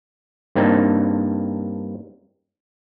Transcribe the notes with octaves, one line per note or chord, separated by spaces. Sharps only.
G2 A#3 C4 D4 D#4